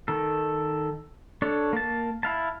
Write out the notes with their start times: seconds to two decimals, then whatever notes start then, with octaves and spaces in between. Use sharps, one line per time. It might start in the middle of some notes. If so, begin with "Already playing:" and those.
0.08 D#3 A4
1.42 D4 A4 C#5
1.73 A#3 A5
2.23 E4 F5 A5